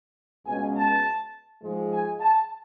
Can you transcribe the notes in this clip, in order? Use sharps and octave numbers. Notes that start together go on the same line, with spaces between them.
C#2 B2 G#3 C#4 G#5
A5
G#2 F3 G#3
G#5
A5